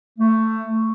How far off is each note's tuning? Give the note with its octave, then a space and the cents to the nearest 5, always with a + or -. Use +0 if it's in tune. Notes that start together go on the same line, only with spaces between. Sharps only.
A3 +15